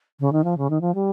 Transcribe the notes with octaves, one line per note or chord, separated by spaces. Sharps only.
C#3
D#3
F3
C#3
D#3
F3
G3